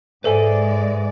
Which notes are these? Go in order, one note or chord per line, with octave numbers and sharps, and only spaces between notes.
G#2 G#3 A4 B4 C5 D5 E5 G#5